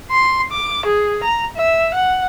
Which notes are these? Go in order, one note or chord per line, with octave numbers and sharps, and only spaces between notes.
C6
D6
G#4
A#5
E5
F#5